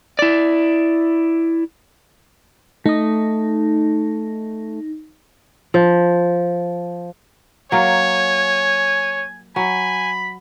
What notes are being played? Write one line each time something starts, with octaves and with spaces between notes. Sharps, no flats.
E4 D5
A3 D#4 D#6
F3
F#3 A#3 A#4 C#5 G#5
F#3 G#5 B5